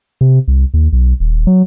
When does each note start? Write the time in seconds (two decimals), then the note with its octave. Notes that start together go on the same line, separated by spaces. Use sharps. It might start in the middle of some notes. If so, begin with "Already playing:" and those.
0.21 C3
0.48 C2
0.74 D#2
0.93 B1
1.20 D#1
1.47 F#3